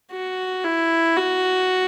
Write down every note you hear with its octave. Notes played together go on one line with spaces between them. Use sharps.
F#4
E4
F#4